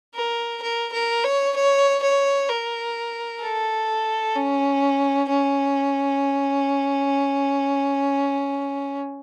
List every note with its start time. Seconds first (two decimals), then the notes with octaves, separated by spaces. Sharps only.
0.15 A#4
0.62 A#4
0.92 A#4
1.24 C#5
1.56 C#5
2.02 C#5
2.49 A#4
3.42 A4
4.35 C#4
5.29 C#4